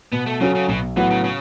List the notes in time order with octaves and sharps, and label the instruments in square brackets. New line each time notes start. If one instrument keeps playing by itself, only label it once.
[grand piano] B2 [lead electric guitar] B3
[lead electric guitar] A3
[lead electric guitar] C#3 [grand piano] F#3 C#4 F#4 A4
[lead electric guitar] C#3
[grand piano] B1 [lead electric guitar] B2
[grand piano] A2 F#3 B3 F#4 [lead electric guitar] E3
[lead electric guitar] C#3
C#3